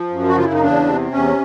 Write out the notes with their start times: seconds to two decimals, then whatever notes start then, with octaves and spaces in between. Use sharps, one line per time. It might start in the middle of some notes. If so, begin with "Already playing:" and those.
Already playing: F3
0.10 F#2
0.28 F#4
0.35 C#3 F4
0.45 E4
0.53 D#4
0.60 E2 D4
0.86 C3
1.11 E2 C#4